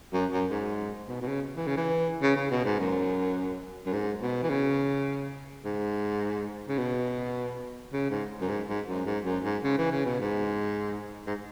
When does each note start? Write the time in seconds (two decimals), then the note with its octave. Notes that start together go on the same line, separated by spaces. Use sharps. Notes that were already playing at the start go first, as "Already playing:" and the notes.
0.13 F#2
0.32 F#2
0.50 G#2
1.08 B2
1.21 B2
1.27 C#3
1.56 E3
1.67 C#3
1.77 E3
2.22 C#3
2.36 C#3
2.50 B2
2.65 G#2
2.79 F#2
3.86 F#2
3.93 G#2
4.21 B2
4.43 E3
4.50 C#3
5.65 G#2
6.68 C#3
6.77 B2
7.93 C#3
8.10 G#2
8.41 F#2
8.49 G#2
8.68 G#2
8.88 F#2
9.06 G#2
9.24 F#2
9.44 G#2
9.63 C#3
9.78 E3
9.91 C#3
10.05 B2
10.20 G#2
11.26 G#2